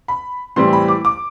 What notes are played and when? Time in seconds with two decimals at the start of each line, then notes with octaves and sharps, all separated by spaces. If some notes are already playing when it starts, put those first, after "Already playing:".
0.08 B5
0.56 A2 E3 G3 C4 C6
0.73 B5
0.88 D6
1.05 D6